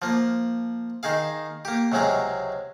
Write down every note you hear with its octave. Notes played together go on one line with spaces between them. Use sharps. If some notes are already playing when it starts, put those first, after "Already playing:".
F3 A#3
D#3 D#4 G#4 F5
A#3 G4
C#2 C3 F#3 G#3 C#4 G#4